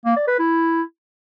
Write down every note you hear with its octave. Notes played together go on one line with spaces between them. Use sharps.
A#3
D5
B4
E4